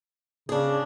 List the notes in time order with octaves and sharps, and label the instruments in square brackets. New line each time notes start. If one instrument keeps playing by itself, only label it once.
[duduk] C#3 [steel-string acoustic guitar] D4 G#4